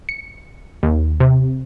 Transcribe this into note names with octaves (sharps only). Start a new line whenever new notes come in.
C#7
D#2
C3